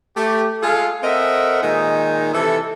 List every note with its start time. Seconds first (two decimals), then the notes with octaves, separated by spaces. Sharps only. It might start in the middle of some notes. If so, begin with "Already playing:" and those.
0.17 A3 G4
0.63 G#3 F4 G#4 A4 F5
1.03 C4 A4 A#4 D#5 E5 F#5
1.63 A#2 D#3 G#3 D#4
2.34 C3 E3 E4 A4